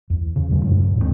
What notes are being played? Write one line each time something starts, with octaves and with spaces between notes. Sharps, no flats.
E2
C#3
E2 C3 F#3 A3
F#2 A#2 C#3 G#3
G#2
D#2 G#2 G#3 C4